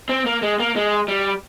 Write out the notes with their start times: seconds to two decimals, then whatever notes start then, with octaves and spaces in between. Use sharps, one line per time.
0.09 C4
0.26 A#3
0.42 G#3
0.60 A#3
0.76 G#3
1.08 G3